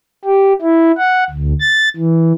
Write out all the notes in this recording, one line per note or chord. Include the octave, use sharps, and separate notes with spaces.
G4
E4
F#5
D2
A6
E3